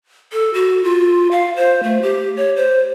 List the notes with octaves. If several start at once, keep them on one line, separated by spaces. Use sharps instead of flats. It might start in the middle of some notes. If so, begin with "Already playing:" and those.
A4
F#4
F4
F5
C5
A3
G4
C#5
C5